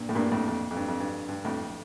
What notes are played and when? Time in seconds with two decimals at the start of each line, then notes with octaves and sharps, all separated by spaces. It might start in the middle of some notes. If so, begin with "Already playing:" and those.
Already playing: G2 A#2
0.09 A2
0.15 G2 A#2
0.31 F2 A2
0.47 F2
0.71 F2
0.76 G2
0.88 F2
1.00 G2
1.28 G2
1.45 F2 A2